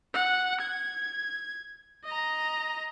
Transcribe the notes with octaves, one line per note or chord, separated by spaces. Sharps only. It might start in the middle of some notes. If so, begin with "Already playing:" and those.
F#5
G#6
D#5 A#5